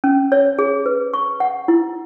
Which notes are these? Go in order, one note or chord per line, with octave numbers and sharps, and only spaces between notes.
C#4
C#5
G#4
B4
C#6
F#5
E4